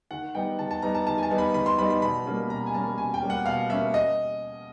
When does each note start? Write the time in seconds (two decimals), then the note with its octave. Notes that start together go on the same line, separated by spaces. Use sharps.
0.11 D#3 F#5
0.35 G3 B3 D#4 G5
0.59 D#3 A5
0.71 A5
0.82 G3 B3 D#4 A#5
0.95 A5
1.07 D#3 A5
1.18 G#5
1.23 A5
1.31 G3 B3 D#4
1.38 B5
1.54 D#3 B5
1.66 C6
1.78 G3 B3 D#4 B5
1.90 B5
2.02 B2 B5
2.26 G3 A#3 C#4
2.50 B2 A#5
2.66 G#5
2.74 G3 A#3 C#4 A5
2.98 B2 G#5
3.14 G5
3.22 G3 A#3 C#4
3.30 F#5
3.45 B2 F5
3.70 G3 A#3 C#4 E5
3.94 D#5